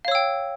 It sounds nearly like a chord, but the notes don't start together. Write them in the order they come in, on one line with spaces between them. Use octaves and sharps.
F5 C#5 E6 G5